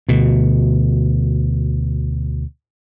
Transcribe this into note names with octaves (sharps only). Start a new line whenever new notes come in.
D2 B2